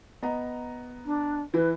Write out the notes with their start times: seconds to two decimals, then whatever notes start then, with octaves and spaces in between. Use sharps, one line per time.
0.23 B3 D#5 A#5
1.05 D4
1.54 E3 E4 B4